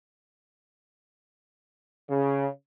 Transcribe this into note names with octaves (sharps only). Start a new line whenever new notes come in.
C#3